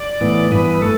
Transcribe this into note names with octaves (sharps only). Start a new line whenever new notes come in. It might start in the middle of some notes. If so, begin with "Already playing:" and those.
Already playing: D5
A2 E3 B3
G2 E3 B3 B4
B4
A3 A4